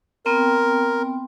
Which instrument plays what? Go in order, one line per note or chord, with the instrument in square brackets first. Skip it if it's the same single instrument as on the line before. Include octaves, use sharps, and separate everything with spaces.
[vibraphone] B3 C4 G5 [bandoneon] A#4